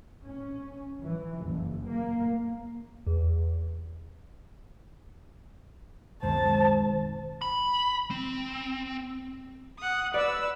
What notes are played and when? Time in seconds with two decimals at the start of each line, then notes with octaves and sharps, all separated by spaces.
0.24 C#4
1.03 E3
1.45 F#1
1.88 A#3
3.07 E2
6.23 C#2 F#2 B2 D#3 G#3 C4 C5 A5
7.42 B5
8.10 C4
9.78 F#5 D#6
10.14 B4 D5 E6